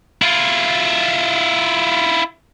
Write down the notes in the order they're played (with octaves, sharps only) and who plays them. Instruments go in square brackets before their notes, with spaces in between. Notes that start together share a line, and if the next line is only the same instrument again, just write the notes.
[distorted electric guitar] E4 F4